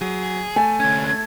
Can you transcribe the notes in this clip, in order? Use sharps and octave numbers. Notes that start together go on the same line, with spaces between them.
F#3 G#4
A3 G#5 A5
D2 C#4 G#6